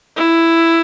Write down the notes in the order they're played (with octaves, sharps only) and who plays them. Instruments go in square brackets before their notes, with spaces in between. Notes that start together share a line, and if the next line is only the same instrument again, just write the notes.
[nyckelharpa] E4